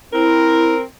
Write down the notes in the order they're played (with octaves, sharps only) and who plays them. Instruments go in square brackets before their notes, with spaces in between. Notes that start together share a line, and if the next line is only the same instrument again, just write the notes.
[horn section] C4 A#4 [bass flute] E4